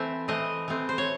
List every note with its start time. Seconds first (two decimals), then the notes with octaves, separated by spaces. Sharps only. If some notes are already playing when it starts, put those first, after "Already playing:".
Already playing: E3 A3 C4 E5
0.28 E3 A3 C4 D#5
0.68 E3 A3 C4
0.89 C5
0.98 C#5